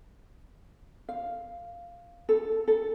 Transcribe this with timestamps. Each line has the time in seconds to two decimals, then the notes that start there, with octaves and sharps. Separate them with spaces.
1.09 F5
2.29 A4
2.68 A4